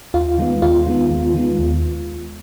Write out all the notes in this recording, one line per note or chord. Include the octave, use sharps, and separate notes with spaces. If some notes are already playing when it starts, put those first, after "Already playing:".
D#2 F4
D#3 G#3 B3
D#2 F4
D#3 G#3 B3
D#2
D#3 G#3 B3
D#2